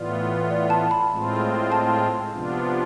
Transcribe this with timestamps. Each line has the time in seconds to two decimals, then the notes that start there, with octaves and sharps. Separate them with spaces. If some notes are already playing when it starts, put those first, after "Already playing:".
Already playing: A2 E3 B3 F4 D5
0.50 D5
0.70 A5
0.91 B5
1.11 A2 G#3 C4 F4
1.72 A5
2.33 C3 F3 B3 D4 F4